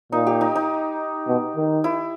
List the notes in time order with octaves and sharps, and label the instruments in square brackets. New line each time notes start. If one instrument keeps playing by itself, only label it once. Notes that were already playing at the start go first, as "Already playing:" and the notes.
[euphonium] A#2 [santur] D#4
[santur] G4
D#4
D#4
[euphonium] B2
D#3
[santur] E4